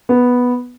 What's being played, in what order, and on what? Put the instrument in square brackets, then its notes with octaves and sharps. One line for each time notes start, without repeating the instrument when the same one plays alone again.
[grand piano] B3